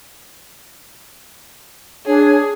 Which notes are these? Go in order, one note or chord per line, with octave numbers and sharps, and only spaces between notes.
D4 G#4 C#5 G#5